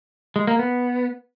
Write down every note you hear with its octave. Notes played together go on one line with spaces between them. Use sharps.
G#3
A#3
B3